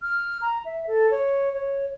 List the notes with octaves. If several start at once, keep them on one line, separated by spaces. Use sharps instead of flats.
F6
A#5
E5
A4
C#5
C#5